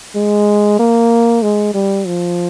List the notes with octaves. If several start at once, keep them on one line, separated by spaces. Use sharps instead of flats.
G#3
A#3
G#3
G3
F3